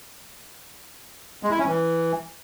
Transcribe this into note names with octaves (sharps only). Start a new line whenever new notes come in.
G#3
E4
C#4
E3